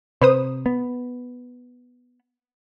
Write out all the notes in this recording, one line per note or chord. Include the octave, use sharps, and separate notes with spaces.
C3 B4 C5 D#6
B3